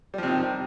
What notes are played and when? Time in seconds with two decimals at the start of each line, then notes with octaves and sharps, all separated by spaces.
0.14 G3
0.18 F3
0.23 C3
0.27 D#3